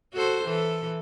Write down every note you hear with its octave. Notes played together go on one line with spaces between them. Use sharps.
F#4 A4 C5
E3 A4